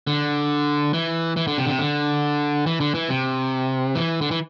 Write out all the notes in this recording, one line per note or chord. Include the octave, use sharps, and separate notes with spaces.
D3
E3
E3
D3
C3
D3
C3
D3
E3
D3
E3
C3
E3
D3
E3